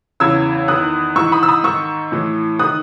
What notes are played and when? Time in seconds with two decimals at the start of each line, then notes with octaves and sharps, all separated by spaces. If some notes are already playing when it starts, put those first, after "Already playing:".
0.20 E2 C#3 E3 E6 G#6
0.68 E2 D#3 D#6 F#6
1.16 G#2 E3 C#6 E6
1.32 B5 D#6
1.43 E6
1.48 B5 D#6
1.64 G#2 D#3 C#6 E6
2.12 A2 E3
2.59 D#3 D#6 F#6